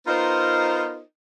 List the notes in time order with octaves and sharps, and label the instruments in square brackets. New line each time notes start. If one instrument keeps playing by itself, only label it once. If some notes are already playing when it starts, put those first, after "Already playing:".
[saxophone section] B3 D#4 F4 A#4 C5 D#5